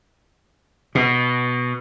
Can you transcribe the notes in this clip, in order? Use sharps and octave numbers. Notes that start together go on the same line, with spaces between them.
B2